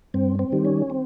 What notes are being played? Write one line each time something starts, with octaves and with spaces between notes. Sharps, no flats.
G2 C4
C4
D#3 G3
C#4
C4